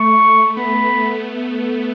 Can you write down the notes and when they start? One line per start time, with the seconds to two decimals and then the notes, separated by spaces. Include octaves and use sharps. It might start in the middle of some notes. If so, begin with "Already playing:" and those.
Already playing: A3 C#6
0.57 B3 B5